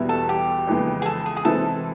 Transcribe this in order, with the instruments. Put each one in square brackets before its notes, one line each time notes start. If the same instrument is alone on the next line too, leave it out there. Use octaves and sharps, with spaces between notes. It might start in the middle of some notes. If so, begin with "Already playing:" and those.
Already playing: [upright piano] E2 B2 G3 B3 E4
[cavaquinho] A4
G4
[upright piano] F2 C#3 E3 G#3 B3
[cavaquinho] G#4
A4
G#4
G#4
[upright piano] C3 E3 G#3 C4 [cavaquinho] A4